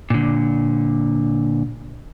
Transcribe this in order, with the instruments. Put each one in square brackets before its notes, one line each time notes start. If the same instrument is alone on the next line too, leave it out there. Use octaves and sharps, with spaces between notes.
[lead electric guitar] A#2 D3